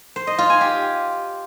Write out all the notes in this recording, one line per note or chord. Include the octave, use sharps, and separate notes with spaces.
C5
D#5
F4
G#5
G4